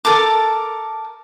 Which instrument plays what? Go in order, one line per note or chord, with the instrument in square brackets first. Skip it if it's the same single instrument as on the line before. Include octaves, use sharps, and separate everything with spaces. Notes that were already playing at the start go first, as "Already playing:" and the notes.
[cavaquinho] A4 A#4 A5 D6